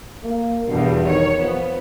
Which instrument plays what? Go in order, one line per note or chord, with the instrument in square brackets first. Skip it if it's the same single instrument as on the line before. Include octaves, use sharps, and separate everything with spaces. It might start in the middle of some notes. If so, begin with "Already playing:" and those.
[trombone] A#3
[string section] E2 B2 [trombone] G2
[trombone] D#3 [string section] C#5
[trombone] F3 [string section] B3